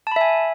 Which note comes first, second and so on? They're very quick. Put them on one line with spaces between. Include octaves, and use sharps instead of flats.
A5 B5 E5 G#5